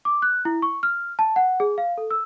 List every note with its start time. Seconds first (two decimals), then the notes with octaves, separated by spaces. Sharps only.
0.05 D6
0.22 F#6
0.45 E4
0.62 C#6
0.83 F6
1.19 A5
1.36 F#5
1.60 G#4
1.78 F5
1.98 A4
2.11 E6